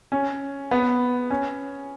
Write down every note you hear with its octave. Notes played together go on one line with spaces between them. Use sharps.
C#4
B3
C#4